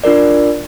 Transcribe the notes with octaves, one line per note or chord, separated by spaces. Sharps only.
D4 F4 A#4 D5